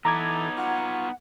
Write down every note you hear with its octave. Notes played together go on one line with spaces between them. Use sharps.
E3 B3 D#4 A4 A#5 D6 G#6
F4 F#5 C#6